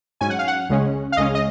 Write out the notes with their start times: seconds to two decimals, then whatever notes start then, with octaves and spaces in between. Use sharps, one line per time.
0.21 G#2 F#3 C#4 G#5
0.30 F#5
0.39 F5
0.48 F#5
0.69 C#2 C#3 G#3 C#4
1.12 F5
1.17 C#2 C#3 G#3 C#4 D#5
1.35 D#5